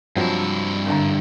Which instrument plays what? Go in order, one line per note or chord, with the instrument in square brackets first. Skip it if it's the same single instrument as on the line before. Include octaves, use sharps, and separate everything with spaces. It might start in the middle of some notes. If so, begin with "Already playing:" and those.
[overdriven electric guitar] G2 E4 [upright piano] F3 F#3 C4
[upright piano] G#1 A#5 [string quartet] D3